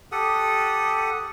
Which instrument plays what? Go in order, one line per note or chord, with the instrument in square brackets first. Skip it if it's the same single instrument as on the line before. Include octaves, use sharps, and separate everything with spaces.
[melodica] G4 A4 F#5 D#6